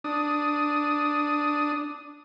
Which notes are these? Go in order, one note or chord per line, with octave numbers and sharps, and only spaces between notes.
D4 D#6